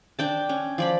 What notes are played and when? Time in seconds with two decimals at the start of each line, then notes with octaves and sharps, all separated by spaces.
0.19 D4 G5 A5
0.49 C#4
0.78 F3 D5 B5